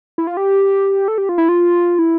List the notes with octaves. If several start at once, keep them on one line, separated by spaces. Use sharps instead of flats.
E4
F4
G4
A4
G4
F4
E4
F4
E4